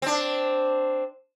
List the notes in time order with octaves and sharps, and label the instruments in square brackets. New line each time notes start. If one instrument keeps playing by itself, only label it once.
[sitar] C4 D4